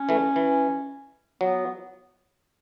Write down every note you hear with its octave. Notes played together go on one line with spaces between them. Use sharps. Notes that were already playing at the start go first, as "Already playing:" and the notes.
Already playing: C#4
E3 A3
E3
F#3 B3